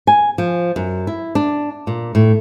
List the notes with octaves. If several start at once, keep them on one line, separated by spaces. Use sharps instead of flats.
G#5
F3
F#2
E4
D4
A#2
A2